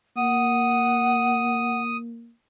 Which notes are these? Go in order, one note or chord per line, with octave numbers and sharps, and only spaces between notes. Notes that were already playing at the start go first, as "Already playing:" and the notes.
A#3 F#5 D#6